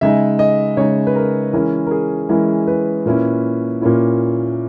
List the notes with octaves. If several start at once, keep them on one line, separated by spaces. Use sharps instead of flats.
C#3 G#3 D#4 E5
D#5
C#3 G#3 D#4 C#5
B4
A#4
E3 G#3 C#4 E4 A#4
A#4
G#4
E3 G#3 C#4 E4 A#4
B4
A#2 A#3 C#4 E4
A#2 A#3 C#4 E4